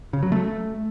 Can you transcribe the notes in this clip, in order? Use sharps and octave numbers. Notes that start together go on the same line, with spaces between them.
C#3
F#3
A3